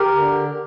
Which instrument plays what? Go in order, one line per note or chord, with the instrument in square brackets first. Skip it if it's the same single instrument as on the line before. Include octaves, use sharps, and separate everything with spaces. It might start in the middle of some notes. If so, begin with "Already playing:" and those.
Already playing: [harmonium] G4 A#4
D3